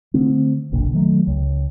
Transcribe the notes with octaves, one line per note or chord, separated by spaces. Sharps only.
D3 A3 C4
F#1 B1 A#2 D3
D#3 F#3 A3
C#2